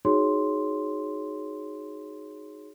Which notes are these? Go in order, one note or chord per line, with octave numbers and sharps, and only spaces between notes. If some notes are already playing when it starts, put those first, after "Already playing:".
D#4 F#4 G#4 C#5 C6